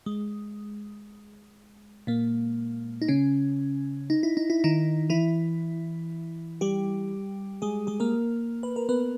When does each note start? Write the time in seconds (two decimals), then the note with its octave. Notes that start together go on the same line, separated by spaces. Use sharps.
0.06 G#3
2.07 A#2 A#3
3.02 D#4
3.08 C#3 C#4
4.10 D#4
4.23 E4
4.37 D#4
4.50 E4
4.64 D#3 D#4
5.10 E3 E4
6.61 G3 G4
7.62 G#3 G#4
7.87 G#3 G#4
8.00 A#3 A#4
8.63 B4
8.76 A#4
8.89 B3 B4